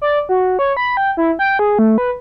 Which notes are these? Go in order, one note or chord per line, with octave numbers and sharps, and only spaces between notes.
D5
F#4
C#5
B5
G5
E4
G5
G#4
A3
B4